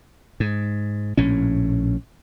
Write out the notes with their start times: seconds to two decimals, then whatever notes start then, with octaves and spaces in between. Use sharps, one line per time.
0.40 G#2
1.17 A#1 A2 C#4